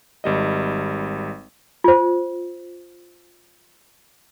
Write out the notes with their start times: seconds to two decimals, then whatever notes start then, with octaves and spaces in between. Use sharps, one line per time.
0.24 G#1 G3 D#5
1.84 F4 C5